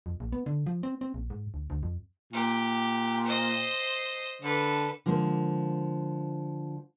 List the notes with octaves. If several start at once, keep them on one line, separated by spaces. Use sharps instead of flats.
F2
A#1
B3
D3
F3
C4
C4
A#1
G#2
D2
D2
F2
A#2 G4
C5 D#5
D3 A4 B4
D3 F3 G#3 A#3